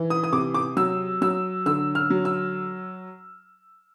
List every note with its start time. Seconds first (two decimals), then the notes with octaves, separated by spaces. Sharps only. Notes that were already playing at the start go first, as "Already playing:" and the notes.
Already playing: E3
0.10 D#6
0.24 D#6
0.32 C3 D6
0.54 D6
0.77 F#3 E6
1.22 F#3 E6
1.66 D3 E6
1.95 F6
2.10 F#3
2.25 E6